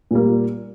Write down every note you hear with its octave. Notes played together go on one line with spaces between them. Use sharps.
A#2 G3 A#3